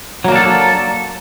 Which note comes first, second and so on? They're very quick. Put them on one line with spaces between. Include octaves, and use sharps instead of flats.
F#3 A#3 D4 A4